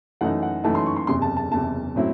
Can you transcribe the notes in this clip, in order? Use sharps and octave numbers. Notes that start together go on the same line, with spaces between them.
F#2 E3 A3 D#4 F#5
F#5
F#2 E3 A3 D#4 A5
C6
C#6
C6
F#1 E2 C3 C6
A5
A5
F#1 E2 C3 A5
A2 F#3 C4 E4